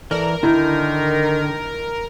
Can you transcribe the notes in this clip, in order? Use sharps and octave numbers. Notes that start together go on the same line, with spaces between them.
E3 A4 A#4 D5
D3 D#3 E4 G6